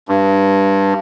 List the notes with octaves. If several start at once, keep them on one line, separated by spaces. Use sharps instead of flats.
G2